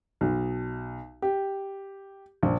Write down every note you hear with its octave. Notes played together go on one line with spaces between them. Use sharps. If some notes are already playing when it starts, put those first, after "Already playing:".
B1
G4
A#1